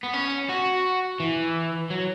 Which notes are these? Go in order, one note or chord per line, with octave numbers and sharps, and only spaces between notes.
B3
C#4
F#4
E3
F#3